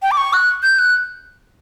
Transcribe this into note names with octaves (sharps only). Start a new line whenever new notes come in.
G5
D6
C#6
F#6
G6
F#6